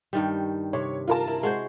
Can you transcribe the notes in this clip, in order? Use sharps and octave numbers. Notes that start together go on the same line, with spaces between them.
G2 D#3 G3
C3 C#5
F4 A#4 A5
E4
G#3 F#4 C5